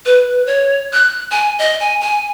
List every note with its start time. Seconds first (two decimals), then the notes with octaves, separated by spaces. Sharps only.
0.06 B4
0.47 C#5
0.93 F#6
1.32 G#5
1.59 D#5
1.80 G#5
2.01 G#5